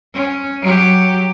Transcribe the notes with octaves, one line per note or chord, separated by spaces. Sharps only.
C#4
F#3 G4